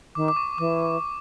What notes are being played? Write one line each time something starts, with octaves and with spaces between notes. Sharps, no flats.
D#3 D6
D6
C#6
E3 D6